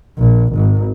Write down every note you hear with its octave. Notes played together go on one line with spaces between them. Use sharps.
A#1
G#1